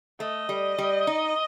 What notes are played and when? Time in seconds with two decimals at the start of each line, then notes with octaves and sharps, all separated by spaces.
0.20 A3 D#5
0.49 G3
0.78 G3
1.07 D#4